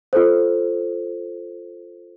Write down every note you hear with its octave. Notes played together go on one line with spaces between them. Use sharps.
F4 A4 C5